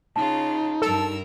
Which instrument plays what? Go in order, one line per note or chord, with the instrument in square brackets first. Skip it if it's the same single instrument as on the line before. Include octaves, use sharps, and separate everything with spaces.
[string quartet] C#3 F4 [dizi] D#4 [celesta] A5
[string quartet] G2 A#4 E6 [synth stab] A4